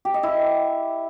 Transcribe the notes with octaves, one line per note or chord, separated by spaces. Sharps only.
G4
D#5
E4